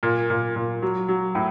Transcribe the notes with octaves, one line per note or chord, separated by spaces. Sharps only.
A#2
A#2
A#2
F#3
F#3
A2